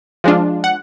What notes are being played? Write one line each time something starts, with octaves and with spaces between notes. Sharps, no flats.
F3 G#3 D4 F4
F#5